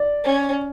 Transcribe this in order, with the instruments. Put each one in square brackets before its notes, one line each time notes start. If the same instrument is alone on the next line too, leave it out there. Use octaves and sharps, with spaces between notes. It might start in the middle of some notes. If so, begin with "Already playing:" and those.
Already playing: [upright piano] D5
[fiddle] C#4